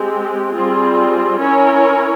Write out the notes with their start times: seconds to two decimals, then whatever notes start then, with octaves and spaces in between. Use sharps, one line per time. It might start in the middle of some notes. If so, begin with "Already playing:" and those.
Already playing: G#3 C4 G4
0.53 G3 C4 F4 G#4
1.38 C#4 E4 A#4 C#5